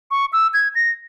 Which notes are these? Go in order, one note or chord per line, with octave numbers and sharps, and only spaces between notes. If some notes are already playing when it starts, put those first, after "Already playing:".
C#6
E6
G#6
A#6